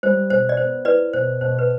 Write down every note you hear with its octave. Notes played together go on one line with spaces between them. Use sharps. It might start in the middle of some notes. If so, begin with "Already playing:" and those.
G3 C5
B2 C5
D5
B3 C5
E4 B4 D5
B2 C5
B2 C5
B4